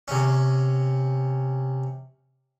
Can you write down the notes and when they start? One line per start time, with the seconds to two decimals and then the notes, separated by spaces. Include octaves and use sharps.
0.08 C3 C#4